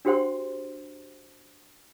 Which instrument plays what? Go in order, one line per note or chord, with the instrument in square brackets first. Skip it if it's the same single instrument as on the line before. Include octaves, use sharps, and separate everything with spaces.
[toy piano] D4 F#4 G4 C5 F#5 C6